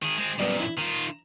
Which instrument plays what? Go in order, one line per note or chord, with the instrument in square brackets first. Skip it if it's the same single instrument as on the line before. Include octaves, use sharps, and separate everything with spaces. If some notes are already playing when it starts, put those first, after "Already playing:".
[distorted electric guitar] D#3 G#4
G#3 C4
[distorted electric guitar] F#2 A#2 [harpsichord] G3 B3
[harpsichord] E4
[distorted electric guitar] D#3 F4 [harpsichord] A#5